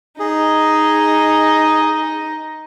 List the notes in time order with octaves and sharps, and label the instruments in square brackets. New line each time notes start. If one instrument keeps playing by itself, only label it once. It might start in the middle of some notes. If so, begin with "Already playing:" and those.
[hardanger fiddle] D#4 D#5 [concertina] G#4